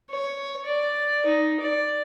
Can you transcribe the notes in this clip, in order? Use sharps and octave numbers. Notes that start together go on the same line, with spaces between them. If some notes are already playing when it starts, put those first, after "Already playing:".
C#5
D5
D#4
D5